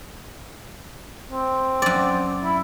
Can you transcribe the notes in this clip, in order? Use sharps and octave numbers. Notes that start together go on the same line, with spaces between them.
C4
F#2 D5
E4